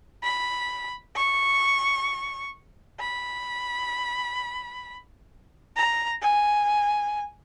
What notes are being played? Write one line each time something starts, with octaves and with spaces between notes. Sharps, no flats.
B5
C#6
B5
A#5
G#5